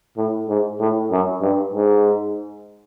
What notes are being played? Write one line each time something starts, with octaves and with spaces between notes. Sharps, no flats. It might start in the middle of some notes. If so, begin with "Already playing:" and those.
A2
G#2
A2
F#2
G2
G#2